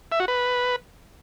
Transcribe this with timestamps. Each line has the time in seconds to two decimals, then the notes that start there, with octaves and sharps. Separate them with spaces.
0.12 E5
0.20 F#4
0.28 B4